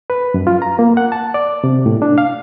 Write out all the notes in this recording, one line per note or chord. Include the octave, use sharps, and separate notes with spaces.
B4
F#2
F4
A#5
A#3
F#5
A5
D5
C3
A2
D4
F5